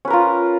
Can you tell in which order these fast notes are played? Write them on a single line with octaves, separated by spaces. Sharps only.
C#4 B4 A#4 F4